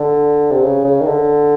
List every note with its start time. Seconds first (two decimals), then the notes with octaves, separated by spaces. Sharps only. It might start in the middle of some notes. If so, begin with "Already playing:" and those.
Already playing: D3
0.51 C3
0.63 C#3
0.84 C#3
1.01 D#3
1.06 D3